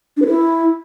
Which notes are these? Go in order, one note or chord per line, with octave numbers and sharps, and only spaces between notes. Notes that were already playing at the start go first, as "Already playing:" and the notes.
D4
B4
E4